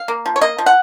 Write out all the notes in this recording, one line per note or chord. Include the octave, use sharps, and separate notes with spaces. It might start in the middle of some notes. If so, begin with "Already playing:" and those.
Already playing: F5
A#3
F3
C#5
A#3 D#5
F3
F#5